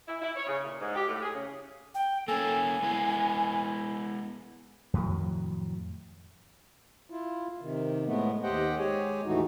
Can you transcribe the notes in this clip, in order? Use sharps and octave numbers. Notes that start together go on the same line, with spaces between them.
E4
E4
C#5
C#3
A#2
G#2
G4
A2
G#4
C#3
G5
A#3 C#4 A4 G#5
G#3 B3 E4
F2 A2 D#3 F#3
E4 F4
C3 D#3
A2 G#3 A3 B3
D#2 G4 C5 D#5 F#5 G5
G#3 G4 G#4 C#5 G#5
D#2 A2 E3 A3 D#4 F#4